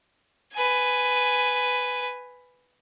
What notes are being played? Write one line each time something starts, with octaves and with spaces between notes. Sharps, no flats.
B4 G#5